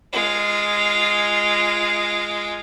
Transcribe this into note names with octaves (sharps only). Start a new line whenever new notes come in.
G#3 F4